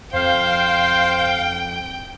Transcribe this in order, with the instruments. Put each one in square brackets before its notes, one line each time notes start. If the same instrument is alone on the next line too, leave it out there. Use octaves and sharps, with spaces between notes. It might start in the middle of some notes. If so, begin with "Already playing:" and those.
[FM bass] F2 [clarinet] C5 [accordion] F5 [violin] G5